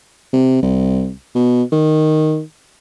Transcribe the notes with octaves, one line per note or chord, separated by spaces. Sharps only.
C3
C2
B2
D#3